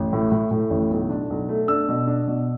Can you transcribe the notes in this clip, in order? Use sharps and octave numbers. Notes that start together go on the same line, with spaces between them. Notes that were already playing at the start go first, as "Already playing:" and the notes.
Already playing: A1
A2
A2
A2
A1
B1
D4
B1
A3
D4 E6
B2
D4
B2